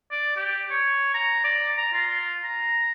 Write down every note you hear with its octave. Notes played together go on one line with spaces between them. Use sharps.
D5
G4
C#5
A#5
D5
A#5
F4
A#5